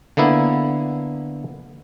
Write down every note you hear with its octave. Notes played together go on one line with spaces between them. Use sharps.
D3 A#3 B3 E4